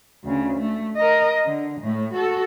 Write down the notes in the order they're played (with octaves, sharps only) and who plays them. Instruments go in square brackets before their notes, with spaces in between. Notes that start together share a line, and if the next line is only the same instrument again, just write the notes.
[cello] D2 C#3
A3
A#4 D#5
D3
A2 A3
F#4 A4